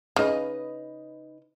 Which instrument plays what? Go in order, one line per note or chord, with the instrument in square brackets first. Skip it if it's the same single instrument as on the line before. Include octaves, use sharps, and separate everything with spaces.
[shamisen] C#3 [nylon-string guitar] D#4 B4 D#5